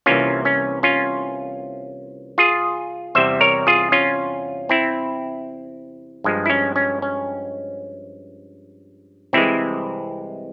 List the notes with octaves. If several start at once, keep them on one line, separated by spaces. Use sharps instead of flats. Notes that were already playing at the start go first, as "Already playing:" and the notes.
C2 C3 E3 A#3 C#4 F4
C#4
C#4 F4
F4 G#4
E2 C3 G3 C5 E5
A#4 C#5
F4 G#4
C#4 F4
C4 E4
G2 F3 G#3
E4
C#4
C#4
C#4
C2 C3 E3 G#3 C4 E4